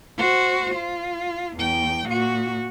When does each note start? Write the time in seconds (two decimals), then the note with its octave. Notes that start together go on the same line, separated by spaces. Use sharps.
0.18 F#4 C5
0.75 F4
1.57 E2 G5
2.08 A#2 F#4